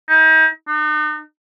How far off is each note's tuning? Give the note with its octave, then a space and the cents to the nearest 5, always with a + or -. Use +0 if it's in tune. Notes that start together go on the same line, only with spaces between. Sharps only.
D#4 +35
D#4 -45